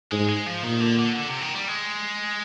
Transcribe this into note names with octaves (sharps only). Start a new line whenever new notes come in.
G#2 G#3
G#3
F3
A#2 D#3
D3
D3
D3
C3
D#3
G3
G#3